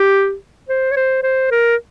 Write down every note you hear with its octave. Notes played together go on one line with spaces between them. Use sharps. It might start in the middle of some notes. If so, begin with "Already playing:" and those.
Already playing: G4
C5
C#5
C5
C5
A#4